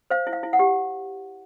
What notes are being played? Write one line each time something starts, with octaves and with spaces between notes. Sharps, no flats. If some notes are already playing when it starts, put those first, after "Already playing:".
C5 F5
E4
F5
E4
F#5
G4